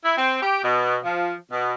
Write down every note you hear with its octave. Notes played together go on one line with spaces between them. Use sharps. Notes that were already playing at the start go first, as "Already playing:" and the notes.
E4
C4
G4
B2
F3
B2